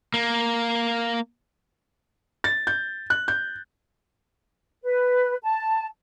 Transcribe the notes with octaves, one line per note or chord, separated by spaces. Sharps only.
A#3
A6
G6
F#6
G6
B4
A5